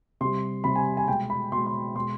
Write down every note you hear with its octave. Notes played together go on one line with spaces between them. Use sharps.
C3 G3 C6
C3 G3 B5
G#5
G#5
B2 G#3 G5
B5
B2 G#3 C6
C6
B2 G#3 C6